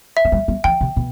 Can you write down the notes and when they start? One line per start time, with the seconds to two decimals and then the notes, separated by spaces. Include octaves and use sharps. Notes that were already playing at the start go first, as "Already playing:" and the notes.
0.17 E5
0.25 F#3
0.32 G3
0.48 G3
0.64 E3 G5
0.81 C3
0.97 B2